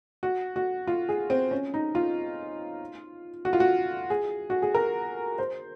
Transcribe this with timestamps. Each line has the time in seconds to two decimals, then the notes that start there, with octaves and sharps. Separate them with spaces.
0.23 F#4
0.56 F#4
0.87 F4
1.09 G#4
1.30 C4
1.51 C#4
1.74 D#4
1.95 F4
3.45 F#4
3.53 F4
3.60 F#4
4.10 G#4
4.50 F#4
4.62 G#4
4.75 A#4
5.38 C5